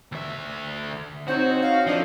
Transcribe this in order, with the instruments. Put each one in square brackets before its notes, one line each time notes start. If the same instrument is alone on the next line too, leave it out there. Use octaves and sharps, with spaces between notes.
[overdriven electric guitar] D2 E5
[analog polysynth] C4 D#4 C#5 [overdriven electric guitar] F#4 [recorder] C5
[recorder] F5
[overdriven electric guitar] F3 [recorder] D4 [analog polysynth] A4 D#5